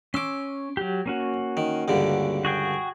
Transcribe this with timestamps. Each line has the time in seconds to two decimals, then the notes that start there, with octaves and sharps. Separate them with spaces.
0.14 C#4 C6 D6 E6
0.77 F#3 G4
1.06 A#3 C#4 F#4
1.57 D#3
1.88 C#2 G2 D3
2.45 F#4 G#4 G5